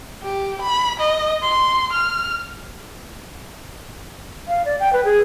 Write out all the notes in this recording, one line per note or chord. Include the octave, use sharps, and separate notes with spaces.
G4
B5
D#5
C6
F6
F5
D5
G5
B4
G#4